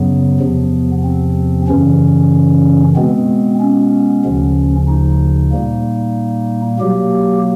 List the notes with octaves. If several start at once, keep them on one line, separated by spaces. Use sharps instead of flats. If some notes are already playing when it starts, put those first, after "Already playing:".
Already playing: F#2 C#3 F#3 B3
E2 C3 F3
C4
F#2 C#3 E3 C#4
B2 G#3 B3 C4
C#4
D2 C#3 F3
D#4
A#2 G3 A#3
B2 F#3 A#3 G4